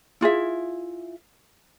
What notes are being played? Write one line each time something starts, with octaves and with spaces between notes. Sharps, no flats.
E4 F4 G#4 E5